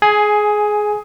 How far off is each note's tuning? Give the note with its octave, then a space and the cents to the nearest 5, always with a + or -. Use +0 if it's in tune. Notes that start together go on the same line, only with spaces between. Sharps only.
G#4 +15 G#5 +0